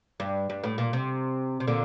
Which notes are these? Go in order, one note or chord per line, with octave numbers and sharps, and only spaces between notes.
G2
G2
A2
A#2
C3
C3
A#2 D3